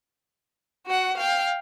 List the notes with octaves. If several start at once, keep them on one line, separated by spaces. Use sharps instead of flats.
F#4 F#5
F5 G5